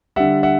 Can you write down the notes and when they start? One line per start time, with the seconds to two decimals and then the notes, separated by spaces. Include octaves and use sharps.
0.16 D3 G3 E5 F#5
0.43 E5 F#5